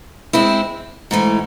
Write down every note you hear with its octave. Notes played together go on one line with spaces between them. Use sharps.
G#3 C4 E4
G#2 E3 A3